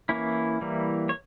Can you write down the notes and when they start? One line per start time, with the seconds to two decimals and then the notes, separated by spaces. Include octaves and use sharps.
0.09 E3 A#3 C#4 E4
0.61 E3 G3 A#3
1.09 C#5